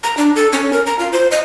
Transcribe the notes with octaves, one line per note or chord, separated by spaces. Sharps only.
A#5
D4
A4
C#4
A#4
A#5
F4
C5
D#5